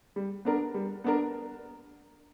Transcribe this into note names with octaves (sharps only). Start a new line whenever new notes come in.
G3
B3 D4 A#4
G3
B3 D4 A#4